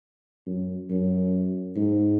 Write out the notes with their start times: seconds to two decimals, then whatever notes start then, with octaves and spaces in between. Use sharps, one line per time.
0.47 F#2
0.90 F#2
1.76 G#2